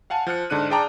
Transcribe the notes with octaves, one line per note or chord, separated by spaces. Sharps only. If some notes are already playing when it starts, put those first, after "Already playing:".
F5 F#5 G#5 A5
F3 F6 F#6 C#7
G#2 D3 D4 F#6 D#7
G#4 D5 G5 A5 A#5 D6